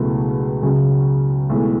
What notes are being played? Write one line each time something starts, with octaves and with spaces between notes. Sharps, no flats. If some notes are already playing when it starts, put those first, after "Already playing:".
Already playing: C#2 B2 F#3 A3 E4
C#2 C#3 F#3
B1 A2 E3 G#3